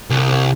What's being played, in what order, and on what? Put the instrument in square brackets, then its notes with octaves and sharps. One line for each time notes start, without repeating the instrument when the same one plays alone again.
[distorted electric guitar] C2